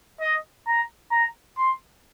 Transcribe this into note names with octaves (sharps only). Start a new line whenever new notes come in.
D#5
A#5
A#5
C6